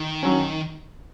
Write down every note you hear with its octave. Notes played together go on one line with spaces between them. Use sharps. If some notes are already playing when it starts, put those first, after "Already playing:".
Already playing: D#3
F#3 C#4